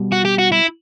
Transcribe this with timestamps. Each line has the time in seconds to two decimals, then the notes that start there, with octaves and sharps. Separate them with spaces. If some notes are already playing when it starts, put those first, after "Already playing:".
Already playing: B2 G3
0.12 F#4
0.25 G4
0.38 F#4
0.52 E4